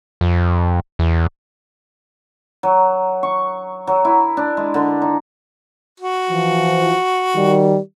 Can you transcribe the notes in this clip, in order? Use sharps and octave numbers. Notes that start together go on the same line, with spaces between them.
F2
E2
F#3
C#6
F#3
E4
D4
G#3
D3
D#4
F#4
E3 F3
D#3 G3